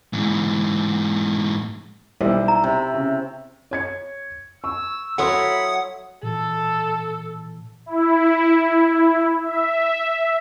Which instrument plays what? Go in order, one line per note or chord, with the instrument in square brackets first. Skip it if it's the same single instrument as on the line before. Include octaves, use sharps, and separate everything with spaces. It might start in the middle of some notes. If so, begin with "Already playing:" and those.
[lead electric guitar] G#2 E3
[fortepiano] B1 G3 C5 [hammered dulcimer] E4
[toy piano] A#5
[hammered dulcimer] C3
[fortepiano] C#3
[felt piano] C#5 G#6 C#7
[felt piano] C#6 [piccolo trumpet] E6
[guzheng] F#3 E4 [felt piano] A4 C6 [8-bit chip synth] F#5 D#6 [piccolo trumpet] B5
[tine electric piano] A#2 E3 [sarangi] A4
[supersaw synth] E4
E5